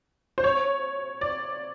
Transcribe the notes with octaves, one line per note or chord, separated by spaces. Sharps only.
C5
C#5
D5